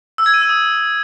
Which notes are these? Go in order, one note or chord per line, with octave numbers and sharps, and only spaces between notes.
E6
G#6
D#7
E6
D#6